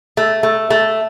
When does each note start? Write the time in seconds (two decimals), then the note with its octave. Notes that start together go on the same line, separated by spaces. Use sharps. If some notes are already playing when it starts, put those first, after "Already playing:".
0.17 A3
0.43 A3
0.70 A3